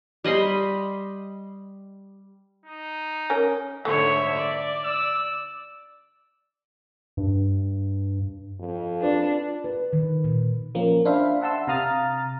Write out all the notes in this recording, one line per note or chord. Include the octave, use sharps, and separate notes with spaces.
G3 D#5 B5 C6
D#4
C#4 A#4
G#2 D3 A3 C#5 E5
D5
E6
G2
F2
D4 F4 B4 D5
B4
D#3
A#2
F3 A#3 C#4
D4 C5 E5 F5 B5
E5 F#5 A5 C6 E6
C3 F5 A#5 D#6 F6 A6